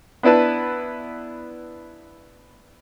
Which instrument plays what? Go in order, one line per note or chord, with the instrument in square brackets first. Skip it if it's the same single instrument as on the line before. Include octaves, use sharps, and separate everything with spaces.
[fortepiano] B3 D4 E4 B4 A5